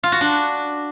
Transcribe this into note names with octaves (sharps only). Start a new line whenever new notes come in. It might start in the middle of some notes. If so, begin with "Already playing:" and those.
F4
F#4
D4